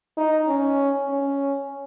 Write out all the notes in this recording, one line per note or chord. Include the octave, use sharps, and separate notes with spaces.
D#4
C#4
C#4